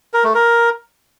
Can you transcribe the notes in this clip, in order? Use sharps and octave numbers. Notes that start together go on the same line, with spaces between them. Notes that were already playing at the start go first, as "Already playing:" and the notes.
A#4
A3
A#4